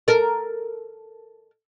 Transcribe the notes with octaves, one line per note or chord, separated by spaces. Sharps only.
A4 A#4